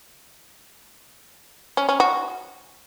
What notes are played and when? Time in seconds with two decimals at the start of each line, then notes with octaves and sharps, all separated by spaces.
1.77 C#4
1.89 C#4
2.00 F#4